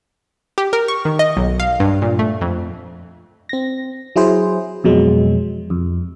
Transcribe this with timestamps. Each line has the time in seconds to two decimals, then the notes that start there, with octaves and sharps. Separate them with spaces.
0.58 G4
0.73 A#4
0.88 C#6
1.05 D#3
1.19 D#5
1.37 B1
1.60 F5
1.80 G2
2.02 A#2
2.19 A3
2.41 F2
3.49 C4 A#6
4.16 F#3 E4 G#4 C5
4.84 F2 B2 F#3 G#3
5.70 F2